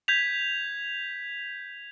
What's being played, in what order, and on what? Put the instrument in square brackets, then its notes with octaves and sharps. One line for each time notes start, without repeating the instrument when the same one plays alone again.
[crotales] G6 G#6 B6 F7